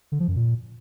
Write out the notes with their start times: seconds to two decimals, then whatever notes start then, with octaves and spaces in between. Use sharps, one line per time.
0.12 D3
0.20 F3
0.28 F#2
0.36 A#2